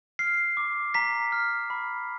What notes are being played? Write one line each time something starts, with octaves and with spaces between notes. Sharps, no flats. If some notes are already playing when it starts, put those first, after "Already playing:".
F6 C7
D6
A#5 B6
F6
B5